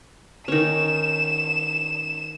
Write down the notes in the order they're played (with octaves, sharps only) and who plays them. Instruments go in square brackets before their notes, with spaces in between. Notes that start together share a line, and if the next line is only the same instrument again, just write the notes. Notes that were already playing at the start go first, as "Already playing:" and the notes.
[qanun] D#3 C#4 [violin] E7